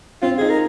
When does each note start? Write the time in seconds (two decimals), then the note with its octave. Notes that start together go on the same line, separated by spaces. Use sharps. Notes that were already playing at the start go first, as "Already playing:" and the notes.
0.22 C4 F4
0.38 D#4 G#4
0.50 A#4